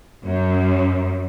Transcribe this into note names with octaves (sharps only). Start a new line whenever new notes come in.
F#2